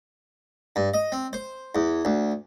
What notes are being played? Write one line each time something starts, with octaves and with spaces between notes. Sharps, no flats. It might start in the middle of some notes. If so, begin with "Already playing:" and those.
G2
D#5
C4
C5
E2
D2